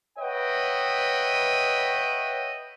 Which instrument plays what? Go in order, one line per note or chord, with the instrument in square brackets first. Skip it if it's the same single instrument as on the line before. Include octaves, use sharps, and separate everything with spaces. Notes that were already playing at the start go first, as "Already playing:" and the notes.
[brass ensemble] B4 C#5 D#5 E5 F#5 G5